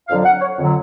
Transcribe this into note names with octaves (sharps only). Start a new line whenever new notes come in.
F2 D3 F#3 F5
F#5
C#5
F2 D3 F#3